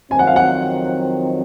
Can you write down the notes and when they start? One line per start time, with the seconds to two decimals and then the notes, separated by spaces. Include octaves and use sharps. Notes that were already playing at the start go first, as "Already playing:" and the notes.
0.11 F2 D#3 F#3 C4 G#5
0.19 F#5
0.27 F5
0.36 F#5